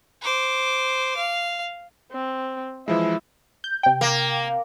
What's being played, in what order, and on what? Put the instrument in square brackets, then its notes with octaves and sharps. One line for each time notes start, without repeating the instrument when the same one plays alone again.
[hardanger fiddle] C5 D6
F5
[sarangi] C4
[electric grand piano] E3 F3 G#3 [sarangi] E4
[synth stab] G6
C3 G5
[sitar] A#3